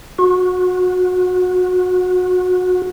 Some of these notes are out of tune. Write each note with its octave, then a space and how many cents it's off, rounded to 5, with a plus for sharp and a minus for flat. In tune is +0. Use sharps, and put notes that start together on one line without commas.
F#4 -25